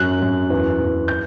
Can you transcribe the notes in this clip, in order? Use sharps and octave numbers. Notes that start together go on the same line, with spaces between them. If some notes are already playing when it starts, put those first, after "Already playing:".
Already playing: F#2 F#3 F#6
F#2
E2
E2
G6